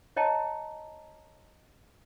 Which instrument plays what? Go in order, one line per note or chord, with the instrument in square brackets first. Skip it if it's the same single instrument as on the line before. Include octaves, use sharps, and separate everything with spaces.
[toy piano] C#5 D#5 G5 A5 A#5